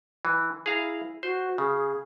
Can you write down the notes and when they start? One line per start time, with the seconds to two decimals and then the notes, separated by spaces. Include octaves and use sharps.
0.25 E3
0.66 E4 G#4 F5 A#5
1.23 F#4 C5
1.58 C#3 G#4